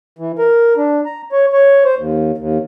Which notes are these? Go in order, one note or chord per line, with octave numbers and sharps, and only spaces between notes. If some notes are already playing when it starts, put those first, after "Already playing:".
E3
A#4
D4
A#5
C#5
C#5
C5
D#2
D#2